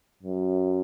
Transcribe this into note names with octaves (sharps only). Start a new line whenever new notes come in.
F#2